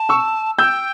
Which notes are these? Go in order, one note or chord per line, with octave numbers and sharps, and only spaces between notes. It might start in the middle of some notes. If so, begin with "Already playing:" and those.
Already playing: A5
C#6 E6
G5 E6 G6